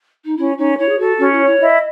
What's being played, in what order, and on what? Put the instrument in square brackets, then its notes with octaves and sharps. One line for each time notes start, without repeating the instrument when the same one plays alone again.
[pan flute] D#4
[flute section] C#4 [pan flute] E4
[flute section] C#4 [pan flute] D#4
[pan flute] E4 [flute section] C#5
[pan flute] G#4
[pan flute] F#4 [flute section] A4
[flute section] C#4 [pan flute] F#4
[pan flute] E4
[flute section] C#5
[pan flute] E4
[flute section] E4 [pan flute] D#5